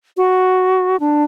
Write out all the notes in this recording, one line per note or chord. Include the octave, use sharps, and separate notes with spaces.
F#4
D4